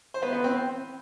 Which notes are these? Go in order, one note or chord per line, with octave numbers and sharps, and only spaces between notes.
C5
B3 B4
B3 B4
C4 C5